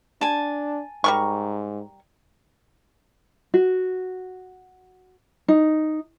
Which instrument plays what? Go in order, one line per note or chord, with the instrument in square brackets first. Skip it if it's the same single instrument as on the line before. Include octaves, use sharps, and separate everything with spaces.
[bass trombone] D4 [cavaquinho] G#5 A5
[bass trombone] G#2 [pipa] G3 A#4 C#6
[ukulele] F#4
D#4